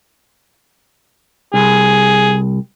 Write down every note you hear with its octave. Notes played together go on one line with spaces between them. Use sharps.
C2 G#4